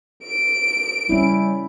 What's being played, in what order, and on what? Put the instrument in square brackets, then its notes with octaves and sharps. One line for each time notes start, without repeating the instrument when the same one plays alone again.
[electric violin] D7
[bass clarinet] G3 [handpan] C#4 E4